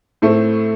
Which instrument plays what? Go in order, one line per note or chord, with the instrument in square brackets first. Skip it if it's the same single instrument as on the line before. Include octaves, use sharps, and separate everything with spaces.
[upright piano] A2 A3 C4